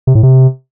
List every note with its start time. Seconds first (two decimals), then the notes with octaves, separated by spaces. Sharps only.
0.07 C3
0.15 A2
0.23 C3